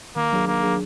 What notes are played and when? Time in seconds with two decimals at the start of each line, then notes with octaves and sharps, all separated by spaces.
0.16 D#3 A#3
0.32 F#3 D4 G#4
0.47 D#3 A#3
0.63 F#3 D4 G#4